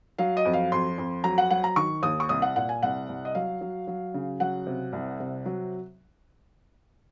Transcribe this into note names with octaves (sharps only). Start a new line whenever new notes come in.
F#3 F5
D#5
F2
F5
F2 C6
F2
F#3 A#5
F#5
F#3 F#5
A#5
D#3 C#6
D#2 D#6
C#6
C2 D#6
F#5
A#2 F#5
G#5
C2 F#5
C2
D#5
F#3 F5
F#3
F#3
C#3
F#3 F#5
C3
C2
C3
F#3